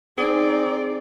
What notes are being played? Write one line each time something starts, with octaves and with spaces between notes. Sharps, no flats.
C4 D#4 G#4 D5